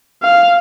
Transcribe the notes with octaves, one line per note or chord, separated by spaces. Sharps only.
F5